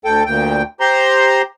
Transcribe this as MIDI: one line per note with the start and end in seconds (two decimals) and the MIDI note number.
0.05 0.23 38
0.05 0.23 69
0.05 0.23 79
0.25 0.63 38
0.25 0.63 46
0.25 0.63 79
0.80 1.42 67
0.80 1.42 72
0.80 1.42 82
0.80 1.42 84